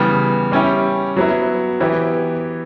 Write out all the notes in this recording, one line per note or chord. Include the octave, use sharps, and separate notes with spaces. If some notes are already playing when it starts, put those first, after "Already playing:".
Already playing: C#3 E3 G3 B3
G3 C#4 E4 G4
F#3 B3 E4
E3 B3 E4 G4